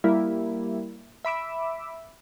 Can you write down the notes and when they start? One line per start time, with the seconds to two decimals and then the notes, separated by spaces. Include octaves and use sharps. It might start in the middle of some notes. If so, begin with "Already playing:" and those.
0.04 G3 A#3 E4
1.25 E5 B5 D6 E6